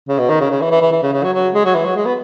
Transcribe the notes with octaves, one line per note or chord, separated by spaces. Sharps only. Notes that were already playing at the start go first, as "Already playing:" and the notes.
C#3
B2
D#3
C#3
C#3
E3
E3
E3
E3
C#3
C#3
F#3
F#3
G#3
F#3
E3
F#3
G#3
B3